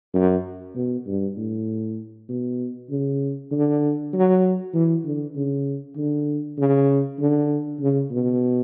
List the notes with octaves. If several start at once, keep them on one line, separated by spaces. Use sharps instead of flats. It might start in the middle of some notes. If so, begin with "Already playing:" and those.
F#2
B2
G2
A2
B2
C#3
D3
F#3
E3
D3
C#3
D3
C#3
D3
C#3
B2